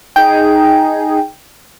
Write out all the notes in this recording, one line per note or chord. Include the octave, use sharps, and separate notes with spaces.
D#4 G#4 G5